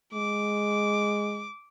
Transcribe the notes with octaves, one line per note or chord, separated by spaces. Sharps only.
G#3 D6